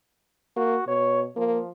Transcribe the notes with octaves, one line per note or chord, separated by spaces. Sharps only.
A#3 F#4
B2 C#5
F3 A#3